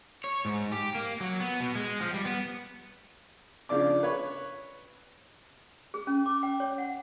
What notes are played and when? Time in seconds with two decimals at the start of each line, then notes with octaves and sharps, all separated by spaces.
0.24 C#5
0.45 G#2
0.72 G4
0.95 A#3
1.21 F#3
1.40 B3
1.60 B2
1.75 G#3
2.01 F3
2.14 G3
2.25 B3
3.69 C#3 F3 D4 D5 D6
4.03 B4 C#5 C#6
5.94 G#4
6.07 C#4
6.26 D6
6.43 G5
6.60 C#5
6.78 F#5